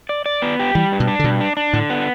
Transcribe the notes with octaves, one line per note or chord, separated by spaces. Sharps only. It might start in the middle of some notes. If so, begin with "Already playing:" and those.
D5
D5
B3
G4
E3 G3
G2
B2
D4
D3
G2 B2
D4
D4
A2 D3
B3